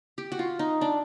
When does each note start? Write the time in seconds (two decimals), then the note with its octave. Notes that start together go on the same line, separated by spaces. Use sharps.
0.18 G4
0.32 F#4
0.39 F4
0.59 D#4
0.81 D4